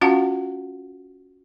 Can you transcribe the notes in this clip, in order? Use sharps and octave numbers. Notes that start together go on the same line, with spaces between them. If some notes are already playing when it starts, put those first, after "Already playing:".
C#4 F4 F#4 F5 F#5 A5